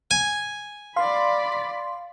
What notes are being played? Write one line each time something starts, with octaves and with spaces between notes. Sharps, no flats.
G#5
D5 F5 B5 C6